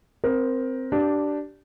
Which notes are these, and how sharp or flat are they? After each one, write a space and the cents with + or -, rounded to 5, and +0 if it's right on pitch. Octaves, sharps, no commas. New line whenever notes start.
C4 +0 A#4 +15
D4 +0 G4 -20